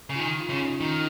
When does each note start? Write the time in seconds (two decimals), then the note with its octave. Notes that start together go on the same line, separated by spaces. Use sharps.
0.10 C#3
0.16 F4
0.19 D#3 D#4
0.40 F4
0.50 C#3 C#4
0.61 D#4
0.81 D#3 D#4